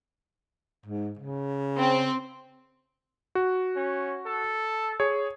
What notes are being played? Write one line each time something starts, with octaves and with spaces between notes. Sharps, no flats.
G#2
C#3
C4
F#4
C#4
A4
G#4 C#5